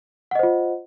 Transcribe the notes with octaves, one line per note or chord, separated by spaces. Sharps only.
F4 C5 D#5 F#5